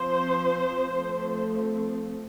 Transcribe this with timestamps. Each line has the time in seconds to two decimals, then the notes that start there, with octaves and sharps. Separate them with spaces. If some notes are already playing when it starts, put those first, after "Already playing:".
Already playing: F3 C4 C5
0.91 F3 A3 C4